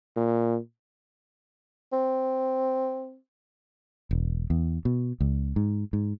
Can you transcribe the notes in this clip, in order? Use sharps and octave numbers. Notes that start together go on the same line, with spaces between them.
A#2
C4
E1
E2
B2
C#2
G#2
G#2